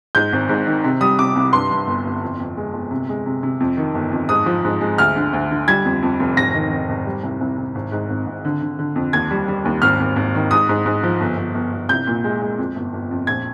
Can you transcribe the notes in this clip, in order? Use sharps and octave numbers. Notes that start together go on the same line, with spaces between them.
G#2 G6
G#1
G#2
D#3
C3
G3 D#6
C3 D6
C2
G2 C6
G2
G1
G1
F2
F2
G#3
G1
C3
G#3
C3
C3
F2
D#3
G1
F2
G#2 D#6
F3
G#2
G#3
D2 F6
D3
D2
D3
G3 G#6
F2
F2
F1
G#1 A#6
D#3
D#3
G#1
G3
C2
C2
C2
G#1
G#2
G#1
G#1
D3
D3
D3
F2
D#2 G#6
G3
G3
D#2
G#1 F6
G#1
G#1
D#3
G#2 D#6
G#2
G#2
F3
G1
G1
G1
G1
C2 G6
A#2
G#3
G#3
F2
G1
G1
F2
A#1 G#6